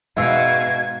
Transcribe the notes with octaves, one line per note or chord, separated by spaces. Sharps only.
G#2 B2 E5 F5 C6 E6 G#6